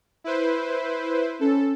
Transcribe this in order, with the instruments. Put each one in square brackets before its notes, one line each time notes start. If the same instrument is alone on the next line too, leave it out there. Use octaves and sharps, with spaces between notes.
[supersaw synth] E4 B4 C5
[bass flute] C#4 [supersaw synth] A4